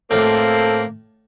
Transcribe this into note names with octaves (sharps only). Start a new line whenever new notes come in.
A2 A#3 C4 F4 A4 D5